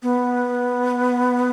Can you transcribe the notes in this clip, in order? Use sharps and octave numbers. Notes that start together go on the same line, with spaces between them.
B3